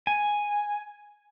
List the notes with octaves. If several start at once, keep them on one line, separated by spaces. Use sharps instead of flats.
G#5